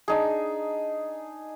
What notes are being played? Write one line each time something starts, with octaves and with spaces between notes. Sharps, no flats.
D4 D#4 G#4